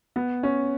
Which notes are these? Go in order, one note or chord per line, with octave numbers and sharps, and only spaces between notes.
B3
C#4